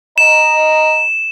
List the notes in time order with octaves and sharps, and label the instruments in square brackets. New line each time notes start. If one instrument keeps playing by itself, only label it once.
[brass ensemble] D#5 A#5 [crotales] E7